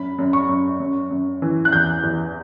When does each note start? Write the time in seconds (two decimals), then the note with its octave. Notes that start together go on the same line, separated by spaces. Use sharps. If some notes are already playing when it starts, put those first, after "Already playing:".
Already playing: F#2 B5
0.19 F#2
0.33 C#6
0.49 F#2
0.80 F#2
1.11 F#2
1.42 E3
1.65 F#6
1.73 E2 G6
2.03 E2